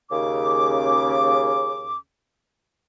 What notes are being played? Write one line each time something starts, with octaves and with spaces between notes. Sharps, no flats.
D#2 C#3 D6